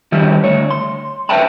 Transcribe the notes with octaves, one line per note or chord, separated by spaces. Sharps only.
D#3 G3 E4 G4
D2 C#5
C6
B4 C5 E5 G5 A5 B5